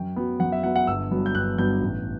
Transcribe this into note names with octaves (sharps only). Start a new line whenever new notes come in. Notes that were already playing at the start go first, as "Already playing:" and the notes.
Already playing: F#2 G5
F#3 B3
F#2 F#5
E5
F#3 B3 F#5
F#5
G1 E6
G2 F#3 B3
G6
G1 F#6
G2 F#3 B3 G6
A1